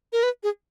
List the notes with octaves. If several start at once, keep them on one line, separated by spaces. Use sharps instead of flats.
A#4
B4
G#4